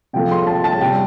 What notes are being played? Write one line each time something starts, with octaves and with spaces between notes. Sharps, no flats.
C3 F3 A3 G5
C6
A5
A5
C3 G3 G5